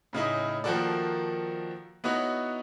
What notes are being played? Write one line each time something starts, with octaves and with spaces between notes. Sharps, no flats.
A2 C#3 D#4 E4
D#3 F3 A#3 F#4 A4 D5
B3 D#4 E4 F#4 C#5